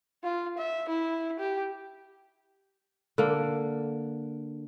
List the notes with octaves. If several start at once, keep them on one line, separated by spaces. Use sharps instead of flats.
F4
E5
E4
G4
D3 A#3